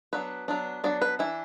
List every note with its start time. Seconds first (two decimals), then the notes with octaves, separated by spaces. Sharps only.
0.13 F#3 B3 D4 B4
0.48 F#3 B3 D4
0.84 F#3 B3 D4 D5
1.02 B4
1.19 E3 D4 E4